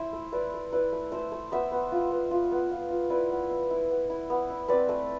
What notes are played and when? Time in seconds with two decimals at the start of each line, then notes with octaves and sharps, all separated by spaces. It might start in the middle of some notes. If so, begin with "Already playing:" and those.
Already playing: E4 C5 E5
0.13 A3
0.32 E4 B4 D5
0.54 A3
0.72 E4 B4 D5
0.92 A3
1.12 A3 C5 E5
1.32 A3
1.52 B3 C5 E5
1.72 B3
1.92 F4
2.11 B3
2.31 F4
2.52 B3
2.71 F4
2.90 F4
3.10 E4 B4 D5
3.30 B3
3.50 E4
3.70 E4
3.89 B3
4.10 E4
4.30 B3
4.50 E4
4.68 C4 B4 D5
4.89 A3